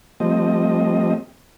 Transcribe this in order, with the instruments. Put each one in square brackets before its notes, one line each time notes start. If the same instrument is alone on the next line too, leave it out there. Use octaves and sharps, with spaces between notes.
[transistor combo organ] F3 G3 A3 C4 D#5